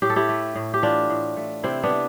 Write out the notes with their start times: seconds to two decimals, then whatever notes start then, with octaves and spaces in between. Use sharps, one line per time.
0.02 A2 G4
0.10 A4
0.16 E4 G4
0.29 A3
0.55 A2
0.74 G4
0.82 E3 D4 F4
1.10 A2
1.37 A3
1.64 C3 C4 E4
1.83 B3 D4
1.91 A3